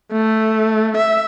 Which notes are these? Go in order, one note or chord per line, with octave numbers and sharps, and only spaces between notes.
A3
E5